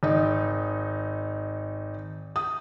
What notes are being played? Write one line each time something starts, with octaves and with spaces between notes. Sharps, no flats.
G#1 D#4
D#6